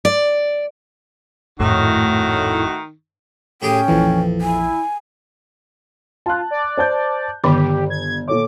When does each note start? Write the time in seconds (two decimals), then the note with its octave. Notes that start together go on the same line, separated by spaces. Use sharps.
0.05 D5
1.60 G#1 F2 A2 D#3 A3 D#4 F#4
3.62 A2 C#4 G4 G#4 G5
3.88 A#1 F2 E3
4.41 E4 G#5
6.26 F4 A5 F#6
6.51 D5
6.78 C5 A5 G6
7.44 G1 D3 D#3 G4 B5
7.90 G#6
8.28 A#2 A4 C#5 D6